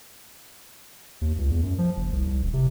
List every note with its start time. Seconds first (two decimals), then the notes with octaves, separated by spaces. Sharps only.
1.21 D#2
1.38 C#2
1.51 E2
1.63 F#2
1.78 F3
1.97 F#1
2.13 C2
2.27 C2
2.42 D#1
2.54 C3